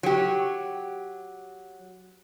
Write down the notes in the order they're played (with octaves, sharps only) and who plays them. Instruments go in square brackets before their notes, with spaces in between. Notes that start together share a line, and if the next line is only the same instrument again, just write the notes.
[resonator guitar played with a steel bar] F#3 G4